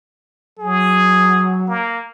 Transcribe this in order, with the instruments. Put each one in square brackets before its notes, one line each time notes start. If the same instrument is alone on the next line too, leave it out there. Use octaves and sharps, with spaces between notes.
[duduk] F#3 [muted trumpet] G#4
[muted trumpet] A#3